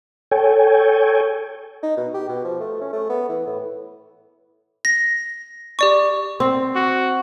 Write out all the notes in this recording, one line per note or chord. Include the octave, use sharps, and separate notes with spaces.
A4 C#5 G5 G#5
D#4
B2
G4
B2
F3
A3
C#4
A3
B3
E3
A2
A#6
G4 D5 C#6
C4
F#4